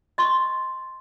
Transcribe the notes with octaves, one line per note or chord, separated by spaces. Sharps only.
D#5 C6 C#6